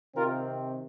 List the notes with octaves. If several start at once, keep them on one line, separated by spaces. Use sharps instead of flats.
C3 D#3 C4 F4 A#4